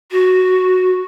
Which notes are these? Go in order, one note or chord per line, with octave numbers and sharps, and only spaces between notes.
F#4